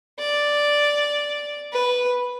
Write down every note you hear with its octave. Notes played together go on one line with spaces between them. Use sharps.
D5
B4